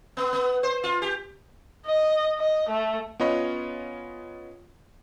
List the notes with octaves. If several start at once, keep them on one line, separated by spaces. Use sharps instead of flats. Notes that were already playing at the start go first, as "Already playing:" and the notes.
B3
B3
C5
F4
G4
D#5
D#5
A3
B3 C#4 F4 C#5 D#5 B5